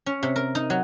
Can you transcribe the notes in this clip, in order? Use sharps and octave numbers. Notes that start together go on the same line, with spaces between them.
C#4
C3
A#4
D#4
F#3